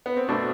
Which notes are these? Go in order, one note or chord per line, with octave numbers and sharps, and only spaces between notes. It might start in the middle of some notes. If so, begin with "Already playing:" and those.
B3
C4
B2 A3 D4